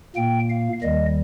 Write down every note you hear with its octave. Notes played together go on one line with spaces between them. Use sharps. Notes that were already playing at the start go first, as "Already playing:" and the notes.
A#2 A#3 G5
F5
D#2 D#3 G3 D#5